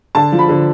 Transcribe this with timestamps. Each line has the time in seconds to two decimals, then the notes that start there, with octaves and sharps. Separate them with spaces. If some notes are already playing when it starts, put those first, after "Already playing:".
0.15 D3 A5
0.32 F3
0.39 B5
0.49 D3